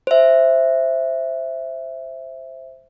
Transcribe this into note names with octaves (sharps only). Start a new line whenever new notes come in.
C5 E5